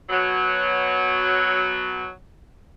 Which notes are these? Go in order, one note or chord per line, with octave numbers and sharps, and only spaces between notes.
B2 F#3